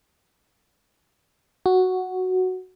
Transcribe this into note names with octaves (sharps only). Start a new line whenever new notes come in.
F#4